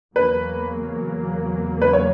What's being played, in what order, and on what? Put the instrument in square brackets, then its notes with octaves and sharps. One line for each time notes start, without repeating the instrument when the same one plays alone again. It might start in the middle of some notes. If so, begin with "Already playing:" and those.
[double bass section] E2 C#3 F#3 A#3 [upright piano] B4
[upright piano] B4
C#5